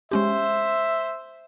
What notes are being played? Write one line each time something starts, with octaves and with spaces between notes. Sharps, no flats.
G#3 C#4 G4 C5 E5